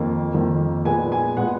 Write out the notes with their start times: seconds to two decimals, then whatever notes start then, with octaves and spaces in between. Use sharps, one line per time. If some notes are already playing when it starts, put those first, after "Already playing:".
Already playing: F2 D#3 A#3
0.34 F2 D#3 A#3
0.85 A#2 G#3 B3 G#5
1.12 G#5
1.37 A#2 G#3 B3 F#5